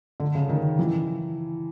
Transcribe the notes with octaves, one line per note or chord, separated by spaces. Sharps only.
D3
C#3
D#3
E3